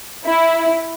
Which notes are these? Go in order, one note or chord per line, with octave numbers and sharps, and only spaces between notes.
E4